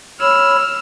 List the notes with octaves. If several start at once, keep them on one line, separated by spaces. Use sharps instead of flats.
C#5 B5 E6 F6